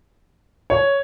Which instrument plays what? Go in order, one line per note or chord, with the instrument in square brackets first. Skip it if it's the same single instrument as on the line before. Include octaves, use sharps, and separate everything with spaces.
[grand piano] C#5